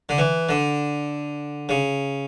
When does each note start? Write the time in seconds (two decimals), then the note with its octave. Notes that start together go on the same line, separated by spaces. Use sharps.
0.09 D3
0.18 E3
0.49 D3
1.69 C#3